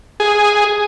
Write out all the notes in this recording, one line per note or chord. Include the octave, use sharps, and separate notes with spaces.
G#4